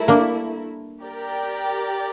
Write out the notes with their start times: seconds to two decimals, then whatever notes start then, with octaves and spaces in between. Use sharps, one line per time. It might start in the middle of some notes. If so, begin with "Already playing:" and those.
Already playing: G3 A3 E4 A#4
0.08 A#3 D4
1.02 G4 A#4 D5 G5